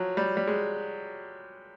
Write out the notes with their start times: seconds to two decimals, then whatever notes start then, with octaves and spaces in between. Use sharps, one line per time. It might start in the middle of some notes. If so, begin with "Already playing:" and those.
Already playing: F3 F#3
0.17 G3
0.37 G3
0.48 G#3